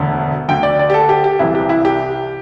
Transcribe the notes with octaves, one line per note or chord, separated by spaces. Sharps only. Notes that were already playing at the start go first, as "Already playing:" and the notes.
Already playing: E1 D2 D3
D2 D3 G5
D5
D5
G4
A4
G4
G4
C2 C3 E3 E4
G4
E4
G4